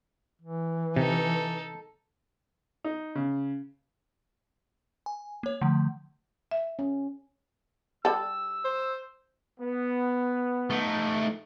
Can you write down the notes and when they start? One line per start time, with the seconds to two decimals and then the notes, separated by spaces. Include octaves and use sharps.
0.42 E3
0.96 C3 D#4 A4
2.84 D#4
3.15 C#3
5.06 G#5
5.43 A#3 C#5
5.62 D3 F3 A3
6.51 E5
6.79 C#4
8.05 G3 A4 E6
8.64 C5
9.60 B3
10.70 A3 D#4